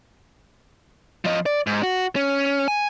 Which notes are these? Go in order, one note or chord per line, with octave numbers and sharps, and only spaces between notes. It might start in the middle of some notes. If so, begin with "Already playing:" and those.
F3 D#5
D5
G#2
F#4
C#4
G#5